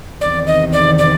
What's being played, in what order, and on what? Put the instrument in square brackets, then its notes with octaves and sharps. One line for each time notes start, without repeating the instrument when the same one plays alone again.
[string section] E2 C3 D#3 [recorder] D5
[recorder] D#5
D5
D5